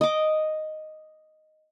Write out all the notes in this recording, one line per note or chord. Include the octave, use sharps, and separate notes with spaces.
D#5 D6